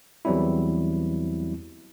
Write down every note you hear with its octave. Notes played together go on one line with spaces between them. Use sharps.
E2 E3 F#3 G3 C4 E4